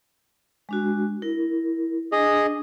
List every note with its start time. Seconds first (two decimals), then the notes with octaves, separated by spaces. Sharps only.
0.69 G#3 D4 F#4
1.22 E4 A#4
2.12 D4 G#4 D#5